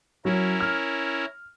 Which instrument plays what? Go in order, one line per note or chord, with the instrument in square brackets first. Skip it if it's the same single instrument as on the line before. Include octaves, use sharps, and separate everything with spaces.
[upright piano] F#3 [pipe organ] C#4 E4 A#4
[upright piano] F6